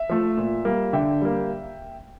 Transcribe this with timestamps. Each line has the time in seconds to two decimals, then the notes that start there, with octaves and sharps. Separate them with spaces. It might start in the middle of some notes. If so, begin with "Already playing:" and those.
Already playing: E5
0.09 F3 A3
0.37 A#2
0.65 G3 A#3
0.93 D3 E5 G5
1.22 G3 A#3